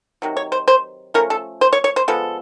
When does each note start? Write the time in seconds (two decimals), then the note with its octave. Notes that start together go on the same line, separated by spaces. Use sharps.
0.22 C3 D#3 F#3
0.37 C#5
0.52 C5
0.68 C5
1.14 F3 A3 C#4 A#4
1.30 A4
1.61 C5
1.73 C#5
1.84 C#5
1.96 C5
2.08 F3 G#3 B3 A4